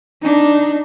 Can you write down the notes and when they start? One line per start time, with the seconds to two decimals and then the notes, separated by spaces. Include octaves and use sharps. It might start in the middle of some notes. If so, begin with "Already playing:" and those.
0.22 D4 D#4